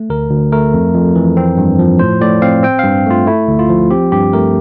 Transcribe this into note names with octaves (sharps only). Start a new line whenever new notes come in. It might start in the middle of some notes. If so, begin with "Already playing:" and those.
Already playing: A3
D2 A#4
D2
A3 A#4
F2
F2
E3
C4
G2
F3
A2 C5
A2 D5
C4 F5
C4 G5
F5
G2
A3 F4
A3 E4
D2
F4
F3
C4 G4
G2 G4
A3 A#4